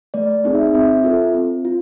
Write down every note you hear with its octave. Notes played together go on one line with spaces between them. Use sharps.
A3 D5
C4 D#4 G#4
E5
C4 E5
F4 A4
C4
F4